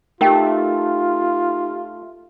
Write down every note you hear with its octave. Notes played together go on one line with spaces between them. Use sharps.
A3 D#4 F4 G4 A#4 G5